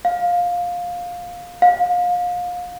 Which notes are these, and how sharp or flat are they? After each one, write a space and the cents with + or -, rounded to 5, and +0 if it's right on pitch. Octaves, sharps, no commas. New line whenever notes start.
F5 +15
F5 +30